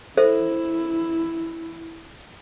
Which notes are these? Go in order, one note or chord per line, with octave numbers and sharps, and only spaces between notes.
E4 A4 C5 E5